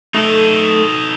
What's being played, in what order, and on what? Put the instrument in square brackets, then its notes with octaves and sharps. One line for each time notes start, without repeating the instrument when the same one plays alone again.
[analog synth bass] A3 [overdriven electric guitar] D#4 A4